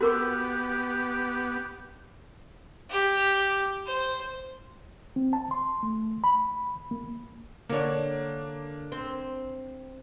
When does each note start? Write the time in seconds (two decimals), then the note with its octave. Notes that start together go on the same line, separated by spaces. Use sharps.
0.01 B3 F#4 G4 A#4 D6
2.90 G4
3.86 C5
5.16 C4
5.33 A5
5.51 C6
5.83 A3
6.24 B5
6.91 A#3
7.69 D3 A#3 D4 C#5
8.92 C4